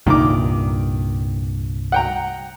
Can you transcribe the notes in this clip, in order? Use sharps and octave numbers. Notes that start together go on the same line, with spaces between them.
C2 G2 A#2 D#3 D6
F#5 G5 A#5